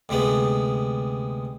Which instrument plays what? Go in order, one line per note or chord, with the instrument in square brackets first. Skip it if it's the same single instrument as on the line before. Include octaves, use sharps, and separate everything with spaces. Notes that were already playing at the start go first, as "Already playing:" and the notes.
[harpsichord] D2 C3 G#3 B3